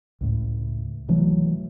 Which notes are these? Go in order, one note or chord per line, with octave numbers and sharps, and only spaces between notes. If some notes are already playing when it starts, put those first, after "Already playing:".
C#2 A2
C3 E3 F#3 A3